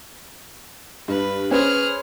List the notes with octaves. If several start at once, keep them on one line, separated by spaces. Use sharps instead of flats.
G2 B4
C#4 G#4 B4 C5 F6